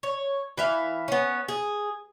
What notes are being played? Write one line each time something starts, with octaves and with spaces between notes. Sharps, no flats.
C#5
E3 E5 F5
B3 C#4
G#4